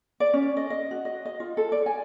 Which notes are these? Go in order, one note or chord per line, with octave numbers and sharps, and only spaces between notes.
D5
C#4
D#5
D#5
F#4
D#5
D#5
F4
A4
D5
G#5